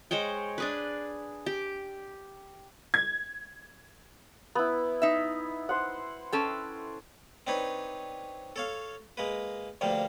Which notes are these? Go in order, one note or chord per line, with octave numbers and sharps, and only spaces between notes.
G#3 C5 C#5 G5
D4 G#4 B4
G4
G#6
B3 E4
D#4 E5
C5 F#5
C#4 A4 G5
C4 D4 D#4 B4 C#5
A4 C#5 F5
G#3 A#3 B4
D2 G2 F3 G3 A#3